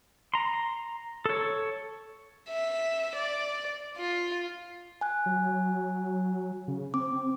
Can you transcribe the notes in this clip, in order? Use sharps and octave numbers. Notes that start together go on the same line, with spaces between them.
A#5 C6
A4 C#5
E5
D5
F4
G#5 F#6
F#3
C#3
C4 D6